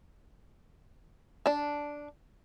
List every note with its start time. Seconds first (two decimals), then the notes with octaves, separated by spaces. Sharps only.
1.46 D4 A5